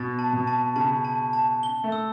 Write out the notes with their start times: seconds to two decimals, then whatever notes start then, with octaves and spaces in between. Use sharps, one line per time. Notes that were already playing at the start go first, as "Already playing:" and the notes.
Already playing: B2 A6
0.19 A5
0.33 B2
0.47 A5
0.76 C#3 A5
1.05 A5
1.33 A5
1.63 G7
1.84 A3
1.92 E6